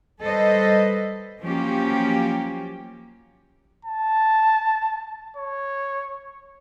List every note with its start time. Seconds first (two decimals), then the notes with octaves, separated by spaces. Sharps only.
0.22 G3 A4 B4 C5 D#5
1.42 F3 F#3 A#3 C#4 G4
3.85 A5
5.37 C#5